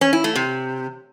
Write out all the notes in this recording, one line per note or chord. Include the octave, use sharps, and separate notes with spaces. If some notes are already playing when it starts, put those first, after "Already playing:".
C#4
E4
A3
C3